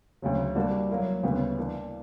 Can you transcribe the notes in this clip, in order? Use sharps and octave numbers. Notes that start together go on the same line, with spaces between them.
D2 C#3 F#3
G3 A#3 D4 F#4
F#3 A#3 E4
D2 C#3 G3 B3
E3 A#3 D4